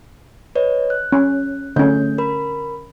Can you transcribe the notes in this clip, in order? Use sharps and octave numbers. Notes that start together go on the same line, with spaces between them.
B4 C#5 D#5
F#6
C#4
D3 A3 C#4 G6
A#4 B5